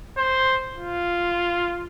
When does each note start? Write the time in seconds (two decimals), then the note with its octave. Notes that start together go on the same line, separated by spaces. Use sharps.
0.17 C5
0.76 F4